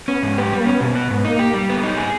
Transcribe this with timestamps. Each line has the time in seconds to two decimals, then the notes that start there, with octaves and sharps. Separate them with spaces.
0.08 B3 C#4
0.22 G#2
0.38 B3 G4
0.52 G3 B3
0.60 A#3
0.66 B3 C#4
0.81 B2
0.95 B3
1.10 G#2 B3
1.25 A#3 D#4
1.39 G4
1.54 G3
1.69 B3
1.83 D#4
1.97 G#4